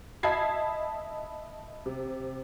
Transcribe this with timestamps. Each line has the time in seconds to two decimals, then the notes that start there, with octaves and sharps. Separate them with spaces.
0.23 D#5 E5 A5 B5 G#6 C7
1.86 C3